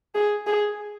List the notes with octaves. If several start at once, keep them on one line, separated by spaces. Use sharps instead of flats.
G#4
G#4